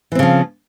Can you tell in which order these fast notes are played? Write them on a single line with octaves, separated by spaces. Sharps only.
E3 C4 C#3 F3